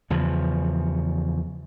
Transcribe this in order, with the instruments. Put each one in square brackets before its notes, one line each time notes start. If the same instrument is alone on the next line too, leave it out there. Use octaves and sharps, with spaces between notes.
[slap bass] E2 C#3 F3